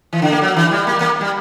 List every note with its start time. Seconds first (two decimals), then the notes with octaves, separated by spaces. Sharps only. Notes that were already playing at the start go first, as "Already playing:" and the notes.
0.13 E3
0.22 D3
0.32 A#3
0.42 F#3
0.57 E3
0.71 G3
0.87 A#3
1.01 A#3
1.21 G3